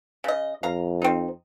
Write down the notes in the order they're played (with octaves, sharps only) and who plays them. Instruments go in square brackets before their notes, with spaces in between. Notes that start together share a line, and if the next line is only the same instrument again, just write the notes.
[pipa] C#3 D#5
[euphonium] F2 [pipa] F5 A#5
[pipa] C4 D#4